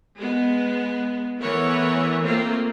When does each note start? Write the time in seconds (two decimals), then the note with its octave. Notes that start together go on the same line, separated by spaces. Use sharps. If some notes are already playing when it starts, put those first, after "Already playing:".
0.18 G#3 B3
1.38 E3 A3 B3 A#4 C#5 F#5
2.22 A3 A#3 C4 F4